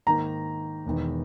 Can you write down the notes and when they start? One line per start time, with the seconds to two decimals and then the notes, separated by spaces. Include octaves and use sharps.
0.07 G#2 D#3 A#3 A#5
0.86 E1 E2 D#3